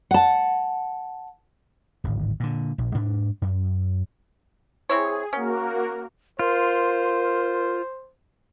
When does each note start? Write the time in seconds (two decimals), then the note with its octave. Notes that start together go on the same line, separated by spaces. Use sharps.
0.11 F#5 A5
2.04 D1 G#1
2.40 A#2 D3
2.78 A#1
2.95 G#2 D4
3.42 F#2
4.89 C4 E4 G#4 C#5
5.33 A#3 C#4 F#4 A#4
6.39 F4 A#4 C5